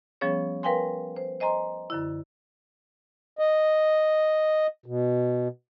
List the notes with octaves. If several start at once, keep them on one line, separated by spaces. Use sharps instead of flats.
F3 G3 B3 C#4 G#4 C#5
A#4 B4 F5 G5 G#5 C6
C5
C5 D#5 G#5 A#5 C6
F#2 D3 E4
D#5
B2